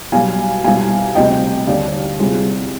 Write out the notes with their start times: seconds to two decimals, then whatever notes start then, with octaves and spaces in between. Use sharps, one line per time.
0.12 B1 B2 G3 F5 G#5
0.64 C2 B2 G3 F5 G#5
1.15 D2 C3 G3 D#5 G5
1.67 D#2 D3 G3 D5 F5
2.19 C2 C3 G3 F4 G#4